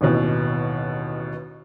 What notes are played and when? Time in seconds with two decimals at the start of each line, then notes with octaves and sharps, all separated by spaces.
0.01 A1 D#2 B2 E3